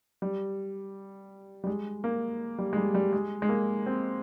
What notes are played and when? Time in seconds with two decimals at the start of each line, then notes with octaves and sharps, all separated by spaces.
0.22 G3
1.64 G3
1.67 G#3
2.04 A#3
2.58 G3
2.73 G#3
2.77 G3
2.94 G3
3.13 G#3
3.42 G#3
3.49 A#3
3.86 C4